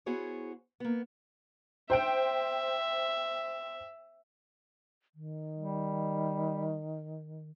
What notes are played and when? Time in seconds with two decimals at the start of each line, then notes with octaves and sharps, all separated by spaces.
0.06 B3 E4 F#4 G#4 C5 C#5
0.80 A#3 B3
1.90 C5 E5 G5 D7
5.15 D#3
5.57 G3